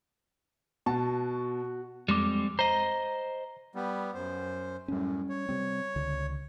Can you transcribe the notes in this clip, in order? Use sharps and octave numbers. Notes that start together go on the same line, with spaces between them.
B2 F#4 A5
F2 G3 G#3 C4 D6
C5 D#5 A#5
G3 B3
F#2 C5
F#2 A2 G3 C#4
C#5
C3 G3 C4
C#2 D3